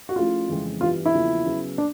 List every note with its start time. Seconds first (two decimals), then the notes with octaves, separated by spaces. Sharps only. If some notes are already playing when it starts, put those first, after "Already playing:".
0.09 F#4
0.16 F3 A3 C#4 E4 F4 G#4
0.49 F2 C#3 E3 G#3 C4
0.81 G2 E3 G3 B3 F4
1.06 E4
1.13 E2 C#3 F3 A#3 C#4
1.45 C#3 F#3 B3
1.78 D4